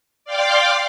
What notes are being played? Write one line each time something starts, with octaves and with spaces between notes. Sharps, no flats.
D5 F5 G5 C6 D6